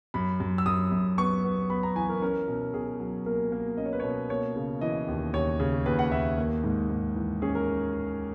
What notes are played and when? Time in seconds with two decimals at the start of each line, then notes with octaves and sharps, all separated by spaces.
0.14 F#2 B5
0.40 F#2
0.58 E6
0.66 F#2 D#6
0.92 F#2
1.18 B3 C#6
1.44 B3
1.70 B3 B5
1.83 A#5
1.95 E3 G#5
2.09 A#4
2.22 C#4 A#4
2.48 B2
2.74 B2 G#4
3.00 F#3
3.26 A#3 A#4
3.52 A#3
3.77 C#4 D#5
3.86 C#5
3.93 B4
4.00 B2 C#5
4.30 A#3 C#5
4.56 C#3
4.81 E3 D#5
5.08 D#2
5.34 D#2 C#5
5.60 C#3
5.86 D#2 B4
5.99 F#5
6.11 D#2 E5
6.38 A#3
6.64 G#2
6.90 G#2
7.16 E3
7.42 C#4 G#4
7.55 A#4